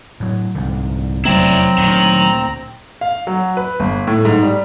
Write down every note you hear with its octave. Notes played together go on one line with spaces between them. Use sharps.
A2 F#3
C2 G#2 D3
F1 E2 F#3 C4 E4 D5 A#5
D2 A#2 D#3
F5
F#3
B4
G1
A2
G#2
G3